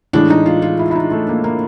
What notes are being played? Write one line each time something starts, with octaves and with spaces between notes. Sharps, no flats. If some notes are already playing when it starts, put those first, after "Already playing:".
A2 E3 G#3 D4
D#4
F4
F4
E4
E4
D#4
A3
A#3
A#3